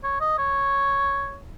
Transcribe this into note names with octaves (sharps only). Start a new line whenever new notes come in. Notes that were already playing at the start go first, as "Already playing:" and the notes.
C#5
D#5
C#5